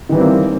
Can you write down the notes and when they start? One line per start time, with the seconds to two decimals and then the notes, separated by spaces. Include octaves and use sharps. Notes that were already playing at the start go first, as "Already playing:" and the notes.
0.09 D#3
0.12 E3
0.15 G3
0.18 C4
0.21 A#3